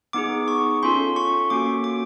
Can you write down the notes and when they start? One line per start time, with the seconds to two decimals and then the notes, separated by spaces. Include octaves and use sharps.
0.13 B3 D#4 G#4 D6
0.48 C#6
0.83 C#4 F4 A4 C6
1.16 C#6
1.50 A#3 C#4 F#4 D6
1.84 D6